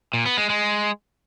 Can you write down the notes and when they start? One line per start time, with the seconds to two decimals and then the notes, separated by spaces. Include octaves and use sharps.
0.14 A#2
0.25 B3
0.37 G#3
0.49 G#3